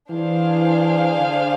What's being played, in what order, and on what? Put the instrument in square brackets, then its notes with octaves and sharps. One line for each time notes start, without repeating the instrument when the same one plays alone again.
[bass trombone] E3 [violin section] D4 G#4 C5 F5
[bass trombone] D3